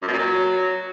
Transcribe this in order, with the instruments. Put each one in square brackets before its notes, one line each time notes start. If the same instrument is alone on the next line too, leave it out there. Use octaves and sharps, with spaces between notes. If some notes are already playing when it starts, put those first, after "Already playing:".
[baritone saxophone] F#2
B2
A#2
F#3